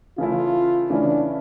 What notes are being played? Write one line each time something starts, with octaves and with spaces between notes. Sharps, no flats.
C#3 E3 A3 C#4 E4 F4
C#3 E3 A3 C#4 D4 E4